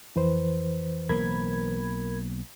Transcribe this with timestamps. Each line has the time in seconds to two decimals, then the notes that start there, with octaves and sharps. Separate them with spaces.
0.16 F2 E3 B4 C5
1.09 B1 A#3 A#4 B5 G#6